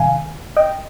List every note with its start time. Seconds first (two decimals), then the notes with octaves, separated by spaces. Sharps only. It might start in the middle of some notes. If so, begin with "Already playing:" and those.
Already playing: C2 C3 D#3 F5 G#5
0.57 D#5 G5